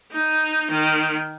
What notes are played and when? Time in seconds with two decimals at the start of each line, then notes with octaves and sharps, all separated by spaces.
0.12 D#4
0.71 D#3